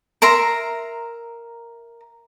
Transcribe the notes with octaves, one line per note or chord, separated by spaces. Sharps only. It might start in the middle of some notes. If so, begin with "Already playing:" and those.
A#4 E5 A#5 C6